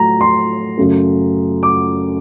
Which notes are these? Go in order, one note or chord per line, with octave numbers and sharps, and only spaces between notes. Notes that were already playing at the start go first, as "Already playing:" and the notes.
Already playing: A2 F#3 A3 A#5
C6
F#2 C#3 F#3 A3
D6